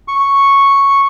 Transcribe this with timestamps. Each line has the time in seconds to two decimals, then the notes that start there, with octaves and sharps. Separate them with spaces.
0.08 C#6